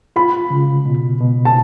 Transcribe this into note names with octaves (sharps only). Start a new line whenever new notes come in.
F4 B5
C#3
B2
B2
A5